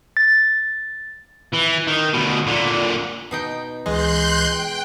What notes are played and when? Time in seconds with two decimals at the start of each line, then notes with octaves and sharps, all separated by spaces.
0.17 A6
1.53 E3
1.87 D#3
2.13 D2 B2
2.47 A#2 D3
3.31 B2 D#4 G5
3.86 C#2 E3 G#3 D#5 C6 F#6 G6
4.47 G5 F#6